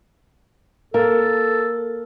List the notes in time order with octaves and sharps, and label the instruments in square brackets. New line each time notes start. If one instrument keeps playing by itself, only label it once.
[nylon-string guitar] A#3 A#4 [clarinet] A4